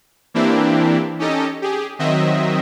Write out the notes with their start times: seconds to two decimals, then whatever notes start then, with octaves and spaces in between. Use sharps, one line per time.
0.34 E3 A#3 C4 D4 E4 G4
1.19 C#4 D#4 G4 A4 D#5
1.62 G4 G#4
1.99 D#3 F#3 C4 D#5 E5